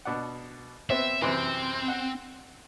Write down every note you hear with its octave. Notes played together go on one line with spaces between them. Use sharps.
B2 D4 F#5
B3 C4 E5
F#2 C3 E3 C4
F#5